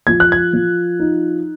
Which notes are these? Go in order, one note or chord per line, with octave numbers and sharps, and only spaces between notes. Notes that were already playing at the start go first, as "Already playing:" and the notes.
F3 G#6
F#6
G#6
F3
D#4